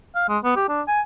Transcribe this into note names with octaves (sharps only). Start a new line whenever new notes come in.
F5
G#3
B3
G4
D4
G#5